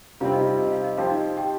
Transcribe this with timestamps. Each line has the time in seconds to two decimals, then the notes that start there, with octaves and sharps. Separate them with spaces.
0.20 C3 G3 C4 F4 F5
0.33 D#4 D#5
0.46 F4 F5
0.60 D#5
0.72 F5
0.84 D#5
0.97 F3 C4 G4 C5 F5
1.10 D#4 D#5
1.37 G4 G5